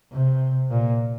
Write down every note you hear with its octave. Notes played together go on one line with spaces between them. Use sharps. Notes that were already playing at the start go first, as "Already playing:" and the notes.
C3
A#2